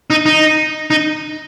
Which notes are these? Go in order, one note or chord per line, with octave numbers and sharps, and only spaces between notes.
D#4
D#4
D#4